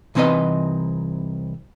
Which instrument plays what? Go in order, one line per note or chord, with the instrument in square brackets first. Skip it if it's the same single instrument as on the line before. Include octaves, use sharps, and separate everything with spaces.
[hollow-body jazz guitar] C2 E3 C4 D#4 B4 D#5